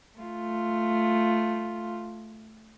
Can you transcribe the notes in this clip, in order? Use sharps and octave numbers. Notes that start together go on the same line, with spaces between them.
A3 F4